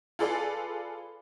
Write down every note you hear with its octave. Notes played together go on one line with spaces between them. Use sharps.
F4 G#4 A4 B4 D5 F5